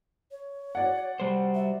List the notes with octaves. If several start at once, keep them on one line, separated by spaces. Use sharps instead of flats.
C#5
F#4 D5 F#5
G3 C5
E5